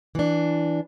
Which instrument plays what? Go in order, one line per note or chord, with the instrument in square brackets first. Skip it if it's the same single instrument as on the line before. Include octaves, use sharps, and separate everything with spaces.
[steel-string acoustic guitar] E3 D4